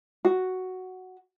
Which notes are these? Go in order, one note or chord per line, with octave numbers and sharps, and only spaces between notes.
F#4